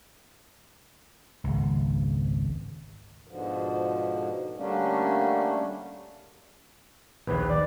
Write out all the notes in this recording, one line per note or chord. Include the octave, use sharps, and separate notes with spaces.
G#1 C#2
G#2 B2 D3 F3
D3 G3 A3 A#3 C#4 D4
A#1 D#2 B4
D5